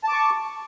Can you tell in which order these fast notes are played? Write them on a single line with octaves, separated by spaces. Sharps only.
A5 D6 C#6